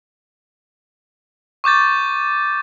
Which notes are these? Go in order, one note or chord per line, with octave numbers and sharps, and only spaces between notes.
C#6 D6 G6 A6